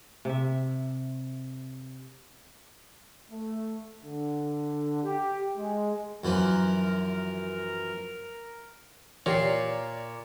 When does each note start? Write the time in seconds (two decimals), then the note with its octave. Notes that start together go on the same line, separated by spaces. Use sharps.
0.25 C3 E5
3.32 A3
4.03 D3
5.04 G4
5.56 G#3
6.24 F#2 E3 F3 A#4
9.26 A#2 E3 G4 A#4 C#5 D5 C7